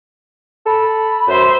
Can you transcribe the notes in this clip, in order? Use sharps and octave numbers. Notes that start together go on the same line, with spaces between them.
A4 B5
F#2 C5 E5 C6